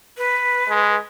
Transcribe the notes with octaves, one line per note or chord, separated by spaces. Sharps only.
B4
G#3